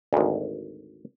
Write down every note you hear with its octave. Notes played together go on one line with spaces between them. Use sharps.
G#1 D2